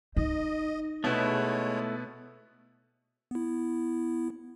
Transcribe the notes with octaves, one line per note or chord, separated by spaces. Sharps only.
D#4 D#5
B2 G#3 A3 B3 E4 C#5
B3 E4